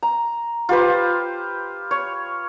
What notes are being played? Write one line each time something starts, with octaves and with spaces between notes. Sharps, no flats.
A#5
F4 G4 B4 C5
C#5